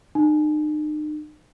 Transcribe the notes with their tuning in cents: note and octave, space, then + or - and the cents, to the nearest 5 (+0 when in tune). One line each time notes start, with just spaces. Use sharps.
D#4 -40